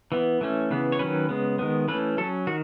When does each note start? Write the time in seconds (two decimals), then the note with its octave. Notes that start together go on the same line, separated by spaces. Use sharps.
0.12 E3 B3
0.41 E3 A3 C#4
0.71 C#3 E3 B3
0.92 C#5
0.99 D#3 F#3 C#4 B4
1.29 C#3 G#3 B3
1.59 D#3 G#3 B3
1.88 E3 A3 C#4 B4
2.18 F#3 C#4 A4
2.47 D#3 F#4